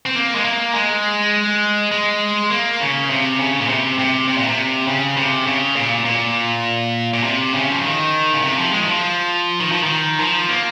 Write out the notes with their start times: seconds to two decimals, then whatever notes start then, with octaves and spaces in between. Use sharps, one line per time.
0.06 C4
0.15 A#3
0.35 G#3
0.44 A#3
0.74 G#3
1.92 G#3
2.51 A#3
2.80 C#3
3.10 C3
3.39 C#3
3.61 A#2
3.69 C3
3.99 C3
4.28 C3
4.37 A#2
4.47 C3
4.87 C#3
5.17 C3
5.47 C#3
5.76 A#2
6.05 A#2
7.13 A#2
7.23 C3
7.54 C#3
7.70 F3
7.83 D#3
8.33 C#3
8.42 C3
8.56 F3
8.72 G#3
8.81 D#3
8.86 F3
9.60 D#3
9.72 F3
9.83 D#3
10.20 F3
10.49 A#3